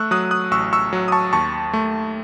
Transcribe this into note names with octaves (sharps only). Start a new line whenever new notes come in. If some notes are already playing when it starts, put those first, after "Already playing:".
Already playing: A3 C#6 E6 F#6
F#3 D#6 F#6
D#6 F#6
A1 C#6 E6
C#6 E6
F#3
D#6
A5 C#6
D#2 A5 C#6
A3